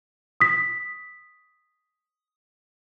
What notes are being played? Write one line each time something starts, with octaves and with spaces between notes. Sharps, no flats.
D#6 B6